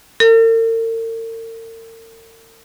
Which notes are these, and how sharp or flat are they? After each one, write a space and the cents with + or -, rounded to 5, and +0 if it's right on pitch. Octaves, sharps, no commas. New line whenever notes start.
A#4 -45